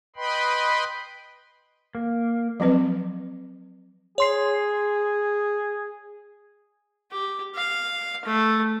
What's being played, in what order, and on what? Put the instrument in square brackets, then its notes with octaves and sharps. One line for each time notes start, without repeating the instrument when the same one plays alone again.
[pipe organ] B4 D#5 G5 B5 C6
[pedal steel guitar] A#3
[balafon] F3 F#3 C4 B4
[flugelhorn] G#4 [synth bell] C#5 C6 C7
[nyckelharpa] G4
F5
A3